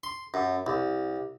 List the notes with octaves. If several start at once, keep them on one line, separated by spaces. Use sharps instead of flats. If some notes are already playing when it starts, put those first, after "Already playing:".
C6
F#2
C2